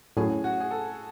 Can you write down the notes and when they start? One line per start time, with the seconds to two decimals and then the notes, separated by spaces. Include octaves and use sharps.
0.17 A2 F#3 C#4 G#4
0.44 F#4
0.60 G#4
0.71 A4